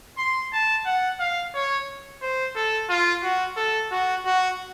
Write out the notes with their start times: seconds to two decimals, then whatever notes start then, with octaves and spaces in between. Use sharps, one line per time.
0.18 C6
0.53 A5
0.86 F#5
1.20 F5
1.54 C#5
2.22 C5
2.55 A4
2.89 F4
3.23 F#4
3.57 A4
3.92 F#4
4.26 F#4